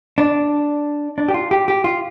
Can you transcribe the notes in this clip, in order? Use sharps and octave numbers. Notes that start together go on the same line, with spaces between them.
D4
D4
G4
F4
G4
G4
F4